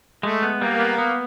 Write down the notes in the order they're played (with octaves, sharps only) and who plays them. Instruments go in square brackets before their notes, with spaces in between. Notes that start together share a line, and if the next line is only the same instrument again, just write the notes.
[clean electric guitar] G#3 [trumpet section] A3
[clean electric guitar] B3
[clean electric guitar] G3 [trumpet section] A#3
[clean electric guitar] B3
B3